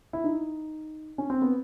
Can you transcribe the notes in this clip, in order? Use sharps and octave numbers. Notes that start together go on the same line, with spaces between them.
E4
D#4
C#4
C4
B3